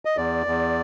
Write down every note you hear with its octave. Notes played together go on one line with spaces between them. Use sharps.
D#5
E2 D5
E2